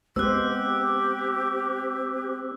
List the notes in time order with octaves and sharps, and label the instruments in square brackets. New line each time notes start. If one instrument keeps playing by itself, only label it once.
[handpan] G#3 B3 C5 [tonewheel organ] C4 [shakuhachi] G4 [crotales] E6 F#6